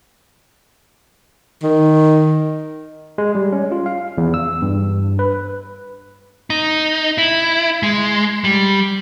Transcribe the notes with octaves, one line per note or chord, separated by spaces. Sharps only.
D#3
G#3
G3
C#4
F4
F5
E2
E6
G2
B4
D#4
E4
G#3
G3